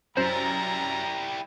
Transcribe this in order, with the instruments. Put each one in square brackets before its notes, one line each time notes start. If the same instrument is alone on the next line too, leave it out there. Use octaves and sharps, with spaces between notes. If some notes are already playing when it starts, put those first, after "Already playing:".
[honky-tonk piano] F#2 [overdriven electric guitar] G3 E4 [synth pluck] C5 [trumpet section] A#5